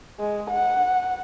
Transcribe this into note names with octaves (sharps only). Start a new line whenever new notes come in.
G#3
F#5